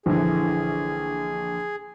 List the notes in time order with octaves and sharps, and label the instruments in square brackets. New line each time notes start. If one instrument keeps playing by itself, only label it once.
[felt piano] A#1 D3 E3 [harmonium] G#4